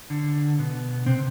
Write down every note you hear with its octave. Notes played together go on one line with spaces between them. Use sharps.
D3
B2 B3
C3 C4